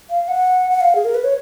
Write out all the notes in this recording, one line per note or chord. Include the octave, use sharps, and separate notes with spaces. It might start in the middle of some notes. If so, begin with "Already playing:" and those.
F5
F#5
F#5
F5
G#4
A#4
B4
C#5